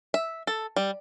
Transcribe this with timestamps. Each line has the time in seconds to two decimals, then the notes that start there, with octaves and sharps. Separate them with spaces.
0.14 E5
0.47 A4
0.76 G3